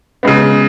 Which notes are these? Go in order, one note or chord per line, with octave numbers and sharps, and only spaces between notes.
C#3 G#3 B3